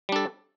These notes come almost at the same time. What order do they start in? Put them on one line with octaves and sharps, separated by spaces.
G3 D4 A4